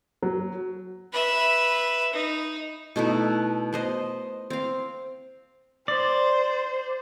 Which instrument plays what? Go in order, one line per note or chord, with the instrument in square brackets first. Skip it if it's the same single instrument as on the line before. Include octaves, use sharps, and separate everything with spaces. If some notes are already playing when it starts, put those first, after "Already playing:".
[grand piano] F#3
[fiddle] B4 E5
D#4
[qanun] B2 A3 D#4 E4
B3 C5 D#5
C4 F5
[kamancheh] C5 [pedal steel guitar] D5